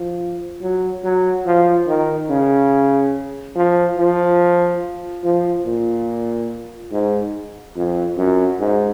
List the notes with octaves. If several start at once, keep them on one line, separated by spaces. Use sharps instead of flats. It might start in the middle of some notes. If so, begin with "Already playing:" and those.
Already playing: F3
F#3
F#3
F3
D#3
C#3
F3
F3
F3
A#2
G#2
F2
F#2
G#2